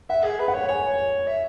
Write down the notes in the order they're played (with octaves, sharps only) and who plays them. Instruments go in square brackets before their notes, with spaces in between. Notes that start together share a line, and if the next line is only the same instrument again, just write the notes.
[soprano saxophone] E5 [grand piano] F#5
[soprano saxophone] G#4
B4
[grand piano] F#5
[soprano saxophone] C#5
[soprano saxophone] C#5 [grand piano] G#5
[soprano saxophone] E5